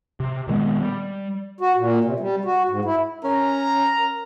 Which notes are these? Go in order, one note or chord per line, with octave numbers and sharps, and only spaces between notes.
C3
A#2 D#3 G#3 B3
G3
F#4
A#2
C3
G3
F#4
G#2
E4
C#4 A#4 A#5